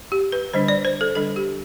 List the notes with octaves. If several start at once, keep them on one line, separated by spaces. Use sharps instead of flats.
G4
B4
D3 G3 D4 C5
D5
C5
A4
D3 G3 D4 A4
G4